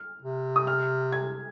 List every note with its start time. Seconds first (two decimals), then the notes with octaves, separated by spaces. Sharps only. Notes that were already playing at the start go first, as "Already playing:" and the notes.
Already playing: F6
0.22 C3
0.56 D#6
0.67 F6
1.12 G#6